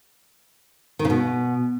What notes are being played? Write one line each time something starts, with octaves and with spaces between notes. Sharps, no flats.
D#3
C#3
B2